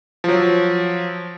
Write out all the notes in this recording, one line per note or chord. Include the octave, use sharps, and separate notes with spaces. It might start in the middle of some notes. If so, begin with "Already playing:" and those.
F3 F#3